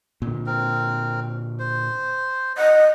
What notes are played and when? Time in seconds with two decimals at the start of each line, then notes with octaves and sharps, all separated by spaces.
0.22 A#2 D3
0.47 C4 A#4
1.59 C5
2.58 D#5 F#5